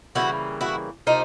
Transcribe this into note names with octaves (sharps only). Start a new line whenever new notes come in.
C#3 E3 G3 A#3 E4 F#4
E4 F#4
C3 F3 A#3 D#4 F4